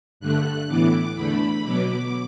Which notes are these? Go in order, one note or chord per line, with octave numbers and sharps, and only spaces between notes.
G2 D3 A3 F#6
A2 E3 B3 D6
E2 D3 A3 B5
B2 F#3 B3 D6